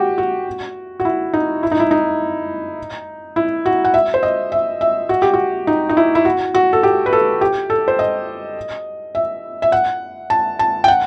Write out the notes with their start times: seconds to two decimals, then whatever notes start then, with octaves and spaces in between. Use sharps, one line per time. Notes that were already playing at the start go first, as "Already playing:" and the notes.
Already playing: F#4 G4
0.18 F#4
1.00 F#4
1.05 E4
1.34 D#4
1.63 E4
1.72 D#4
1.80 E4
1.91 D#4
3.36 E4
3.66 F#4
3.85 F#5
3.94 E5
4.14 C5
4.23 D#5
4.52 E5
4.81 E5
5.09 F#4
5.22 G4
5.34 F#4
5.67 D#4
5.89 D#4
5.97 E4
6.15 E4
6.25 F#4
6.54 F#4
6.73 A4
6.83 G4
7.06 B4
7.13 A4
7.41 G4
7.70 A4
7.88 C5
7.99 D#5
9.15 E5
9.62 E5
9.72 F#5
10.30 A5
10.59 A5
10.84 G5
10.88 F#5